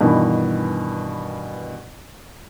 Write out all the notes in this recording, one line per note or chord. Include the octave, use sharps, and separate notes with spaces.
G2 B2 D#3 E3